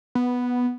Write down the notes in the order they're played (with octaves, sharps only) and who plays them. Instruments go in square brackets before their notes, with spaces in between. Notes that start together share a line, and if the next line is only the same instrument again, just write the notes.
[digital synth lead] B3